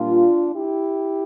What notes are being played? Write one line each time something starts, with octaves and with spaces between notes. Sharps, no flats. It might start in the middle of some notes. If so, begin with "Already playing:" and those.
Already playing: A#2 G3 A#3 D4 F4
E4 G4